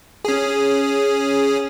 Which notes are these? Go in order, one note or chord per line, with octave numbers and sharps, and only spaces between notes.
C#4 G#4